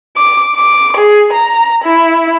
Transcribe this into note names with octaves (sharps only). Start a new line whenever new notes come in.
D6
D6
G#4
A#5
E4